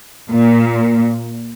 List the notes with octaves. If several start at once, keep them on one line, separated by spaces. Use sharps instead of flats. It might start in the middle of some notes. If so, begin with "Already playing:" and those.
A#2